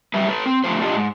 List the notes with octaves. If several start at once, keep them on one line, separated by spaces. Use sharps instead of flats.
F#2 G3 B4 E5
A4 B4
C4
D3 F3 A3 F4 C5
D4 F4 G4 D#5
G#2